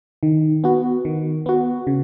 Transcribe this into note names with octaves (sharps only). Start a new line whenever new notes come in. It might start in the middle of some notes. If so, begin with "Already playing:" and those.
D#3
B3 F#4
D#3
B3 F#4
C#3